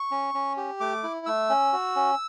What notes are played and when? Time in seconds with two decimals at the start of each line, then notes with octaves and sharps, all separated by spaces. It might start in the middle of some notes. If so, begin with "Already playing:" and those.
Already playing: C#6
0.11 C#4
0.34 C#4
0.57 G4
0.80 A3 D6
1.03 E4
1.26 A3 E6
1.50 C#4
1.73 F#4
1.96 C#4